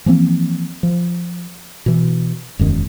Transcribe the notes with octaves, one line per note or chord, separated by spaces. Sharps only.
E3 F3 A#3 C4
F3
B2 E3
E1 F#2 D#3